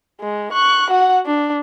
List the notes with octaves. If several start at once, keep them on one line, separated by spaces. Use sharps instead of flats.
G#3
C#6 F#6
F#4 F#5
D4